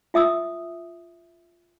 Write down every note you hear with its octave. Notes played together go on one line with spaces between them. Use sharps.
F4 E5 D#6 E6